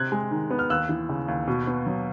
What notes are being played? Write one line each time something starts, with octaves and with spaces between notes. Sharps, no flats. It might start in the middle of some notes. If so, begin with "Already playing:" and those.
Already playing: C3 C4 F#6 G#6
G#3
D#3
B3
F6
D#2 E6 F#6
E3
C#3
D#2
B2
B3
F#3